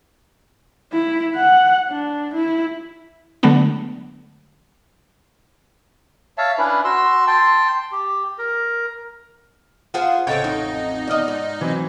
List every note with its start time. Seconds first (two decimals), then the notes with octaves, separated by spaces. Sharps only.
0.92 E4
1.36 F#5
1.89 D4
2.34 E4
3.43 D3 F#3 G#3 A3 B3 D4
6.38 C#5 E5 F5 A5
6.58 C#4 D4 E4 B4
6.84 F#4 C6 E6
7.27 G5 A5 C6
7.92 G4
8.38 A#4
9.94 F4 G#4 C5 F#5
10.27 A1 C#3 A3 C4 C#5 D#5 G5 A6
10.44 F2 D#4
11.08 E2 D5 D#5 F6
11.28 G#2
11.61 E3 F#3 C4